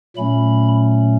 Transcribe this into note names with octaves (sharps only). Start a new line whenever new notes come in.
A#2 F#3 A3 C#4 B5